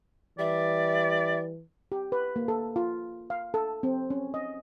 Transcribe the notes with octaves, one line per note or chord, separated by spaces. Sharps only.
E3 G3 D5 E5
G4
B4
A#3
A4
F4
F5
A4
C4
C#4
D#5